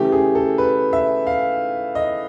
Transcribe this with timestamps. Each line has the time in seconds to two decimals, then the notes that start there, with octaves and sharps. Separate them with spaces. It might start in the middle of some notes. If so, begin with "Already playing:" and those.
Already playing: C#3 E3 A3 G4
0.12 G#4
0.35 A4
0.58 B4
0.93 E5
1.27 F5
1.95 D#5